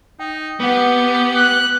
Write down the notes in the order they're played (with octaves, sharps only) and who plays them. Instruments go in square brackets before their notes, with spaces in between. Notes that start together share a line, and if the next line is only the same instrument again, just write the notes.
[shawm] D#4 [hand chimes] G5
[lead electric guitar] B3 [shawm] G4 [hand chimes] B4 F#5
[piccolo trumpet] F#6